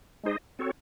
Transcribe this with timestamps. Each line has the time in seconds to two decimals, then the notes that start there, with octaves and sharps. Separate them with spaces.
0.23 G#3 D#4 G#4 C5 D#5
0.59 C4 F#4 A4 C#5